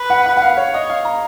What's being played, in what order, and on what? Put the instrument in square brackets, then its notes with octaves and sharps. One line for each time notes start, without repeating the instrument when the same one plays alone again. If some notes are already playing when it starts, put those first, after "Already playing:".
Already playing: [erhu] B4
[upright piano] F#5
F#5
F#5
F5
C#5
[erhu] C#5 [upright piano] D#5
[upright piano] F5
A#5